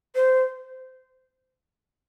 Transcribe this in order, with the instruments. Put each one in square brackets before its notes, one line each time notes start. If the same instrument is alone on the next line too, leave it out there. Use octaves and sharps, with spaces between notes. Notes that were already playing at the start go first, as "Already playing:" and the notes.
[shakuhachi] C5